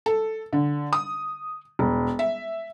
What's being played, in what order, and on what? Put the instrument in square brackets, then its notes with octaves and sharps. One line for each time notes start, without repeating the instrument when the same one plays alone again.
[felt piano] A4
D3
D#6
E1
E5